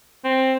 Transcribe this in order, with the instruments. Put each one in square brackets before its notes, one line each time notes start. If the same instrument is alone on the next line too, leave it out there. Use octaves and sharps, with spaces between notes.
[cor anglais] C4